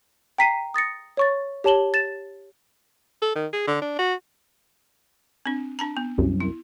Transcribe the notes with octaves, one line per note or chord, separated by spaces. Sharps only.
G5 A#5 B6 C7 D#7
D#6 A6 A#6 C#7
C#5 C#6 A6
G4 C#5 A5 E7 F#7 G7
A6 E7
A4
D#3
G#4
D3
D4
F#4
C4 D4
D4 A5 A#5
B3
C2 F#2
E4